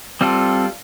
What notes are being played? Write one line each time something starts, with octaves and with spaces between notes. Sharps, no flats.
G3 C4 F4 A4